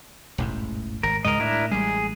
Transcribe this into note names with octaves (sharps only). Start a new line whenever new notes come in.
E1 A1 G#2
G#1 A#4
C#2 G#2 G#3 A#4 D#5
A2 D4 E4 A#4
A1 G3 G#3 G#4